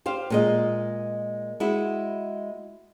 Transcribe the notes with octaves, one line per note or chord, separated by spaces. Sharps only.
G4 C5 F5
A#2 G#3 D#5
G#3 E4 F#4